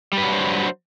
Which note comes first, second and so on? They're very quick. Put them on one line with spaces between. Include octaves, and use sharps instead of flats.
G3 B4 F#3 D4 C5